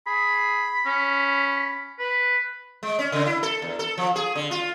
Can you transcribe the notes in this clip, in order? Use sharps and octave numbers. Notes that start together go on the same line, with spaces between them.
G#4 B5
C#4
B4
G#3
C#4
C#3
E4
A4
E2
A4
F3
G#4
D3
F4